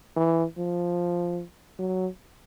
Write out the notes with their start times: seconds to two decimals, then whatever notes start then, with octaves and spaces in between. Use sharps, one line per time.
0.16 E3
0.57 F3
1.79 F#3